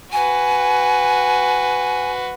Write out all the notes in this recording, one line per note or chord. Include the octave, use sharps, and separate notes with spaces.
F#4 B4 G#5